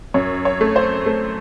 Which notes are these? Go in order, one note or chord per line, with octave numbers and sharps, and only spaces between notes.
F#2 C#5
C#5
A3
C5
A3